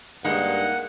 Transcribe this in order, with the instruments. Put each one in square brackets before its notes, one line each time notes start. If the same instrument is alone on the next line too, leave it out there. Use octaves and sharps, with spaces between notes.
[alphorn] G2 [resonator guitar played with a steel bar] G#3 A#3 [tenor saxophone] D#4 [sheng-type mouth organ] F#5